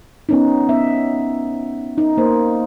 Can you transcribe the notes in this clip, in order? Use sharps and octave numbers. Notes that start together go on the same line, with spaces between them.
B3 C#4 D#4
B3 E5
D#4
A#3 C5